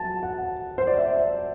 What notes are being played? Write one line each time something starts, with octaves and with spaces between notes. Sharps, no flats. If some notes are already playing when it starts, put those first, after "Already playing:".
Already playing: F#3 A5
F#5
C5
D5
E5